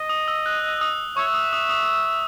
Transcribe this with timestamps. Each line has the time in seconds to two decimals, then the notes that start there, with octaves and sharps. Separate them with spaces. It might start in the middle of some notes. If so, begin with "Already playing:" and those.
Already playing: D#5
0.09 D#6
0.28 E6
0.46 F#6
0.81 D#6
1.17 C#5 E5 C#6
1.34 D#6
1.53 D#6
1.70 D#6